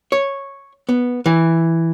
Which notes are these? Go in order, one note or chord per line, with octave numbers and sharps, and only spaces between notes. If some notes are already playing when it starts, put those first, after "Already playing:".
C#5
B3
E3